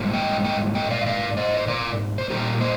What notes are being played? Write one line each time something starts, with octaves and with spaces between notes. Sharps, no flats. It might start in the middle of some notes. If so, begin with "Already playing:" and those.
Already playing: G#2 G3 A#3
D#5 G5
D#5 G5
D#5 G5
D5 F5
D#5
D5 F5
C5 D#5
C5
A#4 D5
C5
A#2 G3 A#3 G4 A#4
C5 D#5